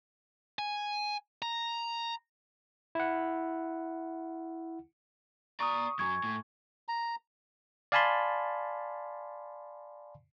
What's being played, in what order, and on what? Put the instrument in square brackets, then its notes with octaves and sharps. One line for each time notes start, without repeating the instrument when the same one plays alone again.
[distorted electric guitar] G#5
A#5
[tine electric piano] E4 F#5
[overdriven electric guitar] D5 A#5 [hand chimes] C#6 D#6
[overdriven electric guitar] F#2 F#3 [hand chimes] G#5 C#6 G#6
[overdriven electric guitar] A2
[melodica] A#5
[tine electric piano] D5 F5 G#5 A5 B5 C6